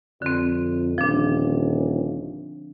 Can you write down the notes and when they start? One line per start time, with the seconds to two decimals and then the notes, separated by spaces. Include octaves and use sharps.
0.22 F2 D3 C4
0.98 D#1 F3 D4